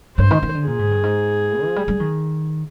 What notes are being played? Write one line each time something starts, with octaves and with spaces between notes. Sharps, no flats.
G2 C5
D#3
D#3
D3
A#2 G#4
G#2
G2
G#2
F3
G3
G3
D#3